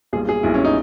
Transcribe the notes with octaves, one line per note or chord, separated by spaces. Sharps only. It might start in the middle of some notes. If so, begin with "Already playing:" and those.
B1 A#2 G3 G#4
G#4
B1 A#2 G3 E4
C#4
D#4